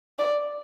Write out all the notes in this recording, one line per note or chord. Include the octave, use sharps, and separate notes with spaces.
D5